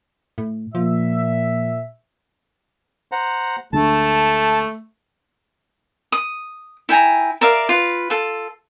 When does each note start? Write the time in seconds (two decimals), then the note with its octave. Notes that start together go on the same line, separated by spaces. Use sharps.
0.38 A2
0.75 A#2 F3 E5
3.12 C5 F#5 A#5
3.73 D2 G#3 A3 D4 A5
6.12 D#6
6.89 E4 G5 G#5 A#5
7.41 A#4 D5 E5 F5
7.69 F4 B4
8.10 F4 A4